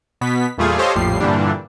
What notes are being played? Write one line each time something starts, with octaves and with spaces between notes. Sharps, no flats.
B2 B3 B6
E2 A#2 G3 A3 F4 G#4
G4 A4 C5 C#5 D#5 F5
A#1 F2 A2 F3 G3 C7
G2 A#2 D3 E3 G3 D4